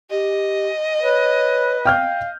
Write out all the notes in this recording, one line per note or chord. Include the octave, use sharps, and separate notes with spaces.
G4 D#5
B4 C#5
F5 G5 F6 G6